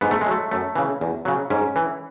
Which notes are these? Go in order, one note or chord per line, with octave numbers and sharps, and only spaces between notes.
G#2 B3
A3
G#3
F#3 A3
F#2 A3
C#3 E3
E2
C#3 F#3
G#2 C#4
E3